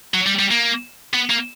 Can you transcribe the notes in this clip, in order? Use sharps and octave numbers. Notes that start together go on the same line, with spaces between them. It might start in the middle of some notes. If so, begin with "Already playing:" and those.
F#3
G3
G3
A#3
B3
A#3